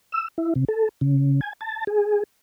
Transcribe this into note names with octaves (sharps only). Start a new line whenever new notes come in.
E6
E4
C3
A4
C#3
G#5
A5
G#4